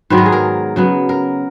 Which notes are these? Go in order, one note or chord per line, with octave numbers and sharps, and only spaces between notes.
G#2 D#3 F#3 B3 B4
A#4
G#4
A#4
C#3 F#3 B3
A#4